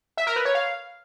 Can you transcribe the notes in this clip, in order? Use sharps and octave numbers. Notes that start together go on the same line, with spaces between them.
E5
A#4
B4
C#5
F5